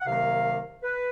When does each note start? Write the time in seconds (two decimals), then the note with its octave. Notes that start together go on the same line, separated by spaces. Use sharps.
0.01 F#5
0.05 C2 C3 D#3 F#3 A#3 F5
0.82 B4